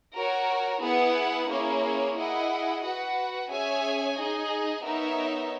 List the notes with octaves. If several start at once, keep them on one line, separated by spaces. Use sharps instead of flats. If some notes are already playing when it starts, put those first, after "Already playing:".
F#4 A#4 C#5
B3 E4 G#4 B4 F#5
A#3 C#4 E4 G#4 C#5
E4 G#4 D#5 F#5
F#4 B4 F#5
C#4 G#4 C#5 E5 G#5
D#4 G#4 D#5 G#5
B3 D#4 A#4 C#5 E5